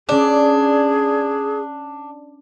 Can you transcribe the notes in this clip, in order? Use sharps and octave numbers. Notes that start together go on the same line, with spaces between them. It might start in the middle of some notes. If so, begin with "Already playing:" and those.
C#4 D4 G#4 D5